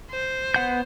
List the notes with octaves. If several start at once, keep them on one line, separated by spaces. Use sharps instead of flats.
C5
B3 F#5 G6